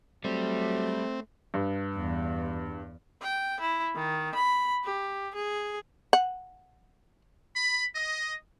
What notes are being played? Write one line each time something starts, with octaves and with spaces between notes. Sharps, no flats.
F#3 G3 A3 C4
G2
E2
G5
E4
D#3
B5
G4
G#4
F#5
B5
D#5